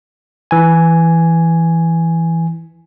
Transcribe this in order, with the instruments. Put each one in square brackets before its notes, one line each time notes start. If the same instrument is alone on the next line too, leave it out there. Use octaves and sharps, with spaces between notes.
[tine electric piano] E3 G#5